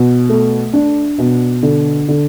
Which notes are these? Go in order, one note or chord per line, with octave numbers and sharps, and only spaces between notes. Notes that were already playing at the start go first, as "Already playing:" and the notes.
Already playing: B2
A3
D4
B2
D3
D3